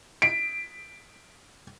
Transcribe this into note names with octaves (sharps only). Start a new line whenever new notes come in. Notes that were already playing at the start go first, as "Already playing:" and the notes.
B6 D7